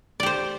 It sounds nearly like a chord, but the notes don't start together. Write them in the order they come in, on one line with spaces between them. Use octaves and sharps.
D5 G4 C5